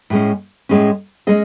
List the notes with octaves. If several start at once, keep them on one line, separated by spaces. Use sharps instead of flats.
A2 G#3 C#4
A2 G#3 C#4
G#3 C#4 G#4 D#5